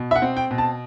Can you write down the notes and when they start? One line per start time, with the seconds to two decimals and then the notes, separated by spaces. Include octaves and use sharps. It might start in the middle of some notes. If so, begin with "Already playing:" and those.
Already playing: B2
0.11 E5
0.16 F#5
0.22 C4
0.37 G5
0.51 B2
0.58 A5